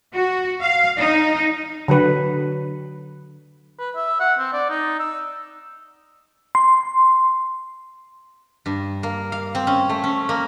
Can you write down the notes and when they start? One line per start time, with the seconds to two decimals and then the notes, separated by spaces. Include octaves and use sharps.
0.13 F#4
0.61 F5
0.99 D#4
1.88 D3 F#3 B4
3.79 B4
3.95 E5
4.20 F#5
4.39 C4
4.53 D5
4.70 D#4
4.99 E6
6.55 C6
8.66 G2
9.03 A#3
9.32 F5
9.55 C4
9.67 C#4
9.89 A3
10.04 C#4
10.29 A#3